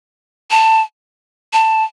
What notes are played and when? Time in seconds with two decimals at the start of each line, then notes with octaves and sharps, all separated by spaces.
0.51 A5
1.53 A5